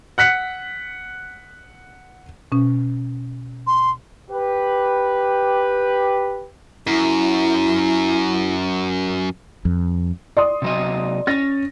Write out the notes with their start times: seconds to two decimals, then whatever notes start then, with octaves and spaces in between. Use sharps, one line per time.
0.18 F#5 F#6 B6 C#7
2.52 B2 C#4
3.67 C6
4.31 G4 B4
6.87 F#2 E4
9.65 F2
10.37 D5 C6 D#6
10.62 C3 F#3 D#5
11.27 C#4 A6 A#6